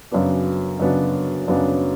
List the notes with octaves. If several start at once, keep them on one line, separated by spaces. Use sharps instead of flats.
F#2 C#3 F#3 B3 D4
F#2 C#3 F#3 B3 D4
F#2 C#3 F#3 B3 D4